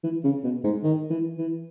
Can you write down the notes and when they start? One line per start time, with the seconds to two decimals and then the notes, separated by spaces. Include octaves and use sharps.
0.03 E3
0.24 C#3
0.43 B2
0.64 G#2
0.83 D#3
1.10 E3
1.38 E3